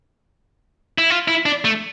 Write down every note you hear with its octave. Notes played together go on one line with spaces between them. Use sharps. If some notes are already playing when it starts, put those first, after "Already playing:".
E4
F4
E4
D4
A3